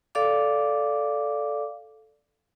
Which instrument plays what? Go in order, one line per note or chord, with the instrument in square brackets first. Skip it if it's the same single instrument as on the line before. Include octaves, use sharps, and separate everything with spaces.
[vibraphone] A4 D5 F5 D6